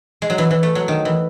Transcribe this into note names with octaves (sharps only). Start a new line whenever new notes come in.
G#3
F#3
E3
E3
A3
F#3
D#3
E3